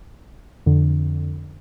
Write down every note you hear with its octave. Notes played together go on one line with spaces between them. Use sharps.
F2 D3